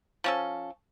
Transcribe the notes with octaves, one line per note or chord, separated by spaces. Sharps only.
F3 C#4 A4